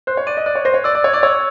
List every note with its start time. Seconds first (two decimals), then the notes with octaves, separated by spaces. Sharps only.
0.07 C5 F#6
0.17 C#5
0.27 D5 D#7
0.37 D#5
0.46 D5 F#6
0.55 C#5
0.65 C5 A#6
0.74 C#5
0.84 D5 E6
0.95 D5
1.04 C#5 G#6
1.13 D5
1.23 C#5 E6